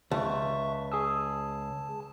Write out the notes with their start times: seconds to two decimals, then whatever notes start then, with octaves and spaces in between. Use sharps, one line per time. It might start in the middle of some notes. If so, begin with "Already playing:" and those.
0.11 C#2 E5 A5 C#6
0.92 G#4 A5 D#6 E6